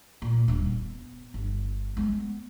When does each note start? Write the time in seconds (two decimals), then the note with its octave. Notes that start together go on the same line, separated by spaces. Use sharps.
0.22 A#2
0.48 D#1 G2
0.66 B2
1.34 G1
1.97 G#3 B3